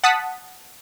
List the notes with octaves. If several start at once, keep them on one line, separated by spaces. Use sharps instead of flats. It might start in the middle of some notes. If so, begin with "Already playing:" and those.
F#5 A5 D#6 B6